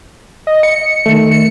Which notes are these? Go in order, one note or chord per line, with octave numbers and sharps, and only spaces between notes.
D#5
C#7
D#3 A3
C#7